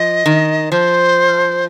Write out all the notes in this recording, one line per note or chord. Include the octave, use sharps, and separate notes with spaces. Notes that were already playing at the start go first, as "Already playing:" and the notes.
Already playing: F3 D#5
D#3
F3 C5